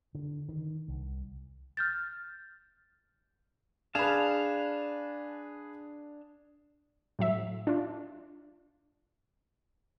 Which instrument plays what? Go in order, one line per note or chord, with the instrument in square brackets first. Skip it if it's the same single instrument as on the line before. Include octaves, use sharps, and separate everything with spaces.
[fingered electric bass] D3
D#3
C2
[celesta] F6 G6 A6
[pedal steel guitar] D4 F5 A5 [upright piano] G#4 B4
[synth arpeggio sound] A2 F#3 E5
D4 F4